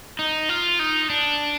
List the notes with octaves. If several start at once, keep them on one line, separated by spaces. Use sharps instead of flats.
D#4
F4
D#4
D4